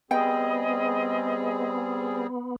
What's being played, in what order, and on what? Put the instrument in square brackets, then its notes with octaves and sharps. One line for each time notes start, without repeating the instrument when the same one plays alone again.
[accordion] G3 C4 G#4 [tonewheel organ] B3 [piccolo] D#5 [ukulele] G5